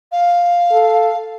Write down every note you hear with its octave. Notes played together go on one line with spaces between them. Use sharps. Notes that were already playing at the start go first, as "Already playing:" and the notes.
F5
A4